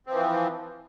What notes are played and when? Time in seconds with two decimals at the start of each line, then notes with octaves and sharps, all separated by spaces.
0.07 C4
0.10 F3
0.13 E3